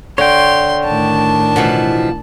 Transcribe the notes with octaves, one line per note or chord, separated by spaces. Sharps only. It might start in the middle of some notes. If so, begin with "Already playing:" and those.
D3 C#5 G5 C6
A2 D#3 D4 A5
B2 E3 F3